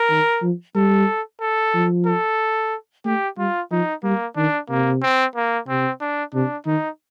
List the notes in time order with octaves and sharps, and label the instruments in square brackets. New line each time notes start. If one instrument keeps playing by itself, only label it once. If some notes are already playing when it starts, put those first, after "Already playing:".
Already playing: [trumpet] A#4
[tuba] D#3
F3
[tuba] G3 [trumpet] A4
[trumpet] A4
[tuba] F3
[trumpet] A4
[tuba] A3 [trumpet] G4
[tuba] G3 [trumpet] F4
[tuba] F3 [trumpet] D#4
[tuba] G3 [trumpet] A#3
[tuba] D#3 [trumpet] D4
[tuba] C3 [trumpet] A#3
[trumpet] C4
A#3
[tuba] C3 [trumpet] C4
[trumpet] D4
[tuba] C3 [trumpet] D4
[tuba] D#3 [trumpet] D#4